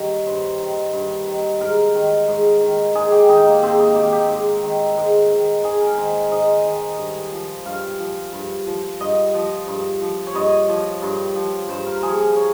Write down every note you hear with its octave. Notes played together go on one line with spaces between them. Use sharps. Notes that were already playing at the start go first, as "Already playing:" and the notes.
Already playing: G2 D#3 C#5
G2 C5
D#3
G2
D#3
G#2 A#4
D#3
G#2
D#3
G#2 G#4
G4
D#3 D#4
A#3
G#2 C4
D#4
D#3 G4
G4
G#2
D#3
G#2
D#3
G#2 G#4
A#4
D#3 C5
G#2 D#5
D#3
G2
F3
G2 F5
F3
G2
F3
G2 D#5
F3
G2
F3
C#5
G2 D#5
F3
G2
F3
G2 C5
A#4
F3 G#4
A#4
C#5